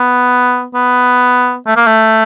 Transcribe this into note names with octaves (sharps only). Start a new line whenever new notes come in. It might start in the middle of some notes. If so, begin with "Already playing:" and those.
Already playing: B3
B3
A3
A#3
A3